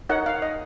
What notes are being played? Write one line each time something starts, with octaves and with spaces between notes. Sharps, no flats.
D#4 A#4 C#5 F#5
F5
D#5